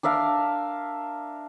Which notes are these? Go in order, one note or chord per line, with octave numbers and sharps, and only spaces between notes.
D4 A#4 E5 F5